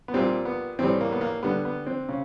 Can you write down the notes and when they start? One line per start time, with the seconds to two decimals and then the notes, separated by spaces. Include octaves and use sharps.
0.08 B3
0.14 A#2 G3 C4
0.45 B3
0.79 A2 E3 G3 C4
1.01 A#3
1.12 B3
1.21 A#3
1.43 D3 G3 B3
1.65 B3
1.87 C4
2.09 C#3